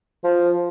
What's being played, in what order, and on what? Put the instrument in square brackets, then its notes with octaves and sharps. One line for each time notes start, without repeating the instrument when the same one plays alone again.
[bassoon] F3